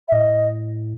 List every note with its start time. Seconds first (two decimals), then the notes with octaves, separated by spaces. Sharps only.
0.08 E5
0.12 A2 D#5